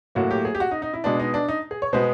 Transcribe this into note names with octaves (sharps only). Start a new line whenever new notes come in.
A2 F#3 A#3 F#4
G4
G#4
G4
F#4
D#4
D#4
E4
B2 G#3 B3 D4
D#4
D4
D#4
G#4
C#5
B2 G#3 B3 C5